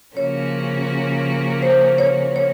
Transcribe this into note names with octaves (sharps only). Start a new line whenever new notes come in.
C#3 F3 A#3 C#4 F#4 C#5
C5
C#5
C#5